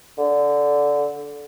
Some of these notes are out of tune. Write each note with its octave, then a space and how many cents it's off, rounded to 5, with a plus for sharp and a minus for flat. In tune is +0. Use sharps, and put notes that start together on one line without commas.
D3 -15